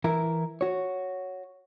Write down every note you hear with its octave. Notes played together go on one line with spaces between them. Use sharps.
E3 E4 A#4
F#4 C#5